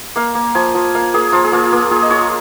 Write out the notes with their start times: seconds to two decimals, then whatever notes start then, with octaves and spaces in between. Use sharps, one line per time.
0.16 A#3 F5
0.35 A#3
0.55 F3 G#5
0.74 F3
0.95 A#3 F5
1.14 A#3 G#4
1.32 F3 F4
1.44 G#4
1.52 A#3 F4
1.72 A#3 G#4
1.91 F4 G#4
2.02 D#5
2.10 F4 C#5